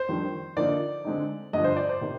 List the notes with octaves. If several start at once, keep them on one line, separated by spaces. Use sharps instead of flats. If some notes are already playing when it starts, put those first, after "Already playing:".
Already playing: C5
F2 D#3 G3 D4
D3 F3 A#3 D#4 D5
D3 G#3 C4 D#4
G2 D3 F3 D#5
C5
D5
C5
C3 D#3